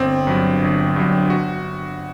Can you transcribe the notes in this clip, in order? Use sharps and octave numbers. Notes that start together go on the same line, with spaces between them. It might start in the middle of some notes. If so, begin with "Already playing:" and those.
Already playing: G1 C4
G2 F#3
G1
G2 F#3
F#4